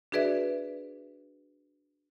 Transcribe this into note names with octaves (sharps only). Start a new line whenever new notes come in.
D4 F#4 G#4 B4 D5 E5